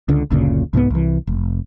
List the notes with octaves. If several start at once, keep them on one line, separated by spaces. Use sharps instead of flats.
C#2 D3
F#1 D2 A#2 C#3
C2 G#2 G#3 B3
C2 E3
F1